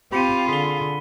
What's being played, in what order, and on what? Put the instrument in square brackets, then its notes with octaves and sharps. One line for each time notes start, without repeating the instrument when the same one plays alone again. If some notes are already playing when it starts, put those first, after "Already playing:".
[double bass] C4 [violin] F4 [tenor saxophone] G4 [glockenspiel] B5 C#7 D#7
[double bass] D3 [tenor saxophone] G#4 [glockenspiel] B6 G7